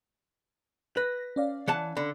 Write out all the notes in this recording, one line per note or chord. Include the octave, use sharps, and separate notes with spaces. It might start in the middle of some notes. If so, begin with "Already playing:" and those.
B4 A#6
C#4 D5 F5
E3 F#5 A5
D3 B5